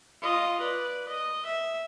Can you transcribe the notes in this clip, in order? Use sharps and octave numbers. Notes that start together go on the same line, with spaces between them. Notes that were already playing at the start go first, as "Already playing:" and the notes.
F4 D#5
B4 D5
D#5
E5